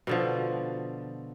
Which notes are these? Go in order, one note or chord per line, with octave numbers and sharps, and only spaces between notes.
B2 D3 F3